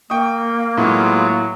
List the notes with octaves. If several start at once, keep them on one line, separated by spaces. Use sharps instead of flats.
A#3 G5 C#6 D#6
A2 F#3 G#3 B3 F4